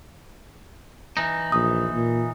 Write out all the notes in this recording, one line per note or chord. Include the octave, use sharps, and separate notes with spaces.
E3 D#4
A#1 D#6
A#2